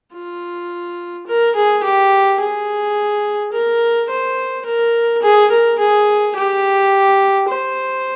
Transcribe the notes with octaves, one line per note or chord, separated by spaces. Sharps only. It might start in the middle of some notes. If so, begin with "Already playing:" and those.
F4
A#4
G#4
G4
G#4
A#4
C5
A#4
G#4
A#4
G#4
G4
C5